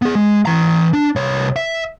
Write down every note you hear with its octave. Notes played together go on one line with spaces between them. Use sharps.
B3 G#4
G#3
E3 A#5
D4
C2 C#5
E5